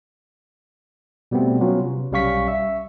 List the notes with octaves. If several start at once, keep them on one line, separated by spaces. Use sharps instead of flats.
B2 G3 A3 B3 C4
F#3 B3 C#4 F4 F#4
C3
B1 G3 C#4 F5 C#6 B6
E5